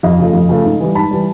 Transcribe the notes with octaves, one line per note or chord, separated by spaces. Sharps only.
F2 D#5 F5
C#3 F3 A3
F2
C#3 F3 A3
G#2
E3 G3
G#2 A5 B5
E3 G3